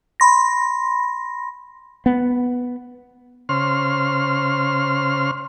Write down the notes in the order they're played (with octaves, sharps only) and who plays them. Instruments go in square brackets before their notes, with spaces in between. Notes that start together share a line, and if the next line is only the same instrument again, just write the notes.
[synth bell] B5 C6 A#6
[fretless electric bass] B3
[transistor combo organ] C#3 C5 C6 F6